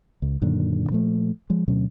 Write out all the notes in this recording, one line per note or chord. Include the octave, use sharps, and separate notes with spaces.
C#2
F#2 A#2 D3 D#3
A#2 F3 A3
F3 G#3
D2 B2 F#3 C#4